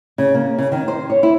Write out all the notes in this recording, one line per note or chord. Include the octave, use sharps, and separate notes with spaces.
C#3
A#3
C#3
D#3
C5
C#5
E4